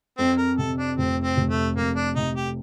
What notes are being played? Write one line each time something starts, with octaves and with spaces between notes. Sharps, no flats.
F2 C4
A#4
C3 A4
D4
F1 C4
C4
F1
A3
F2 A#3
D4
C3 D#4
G4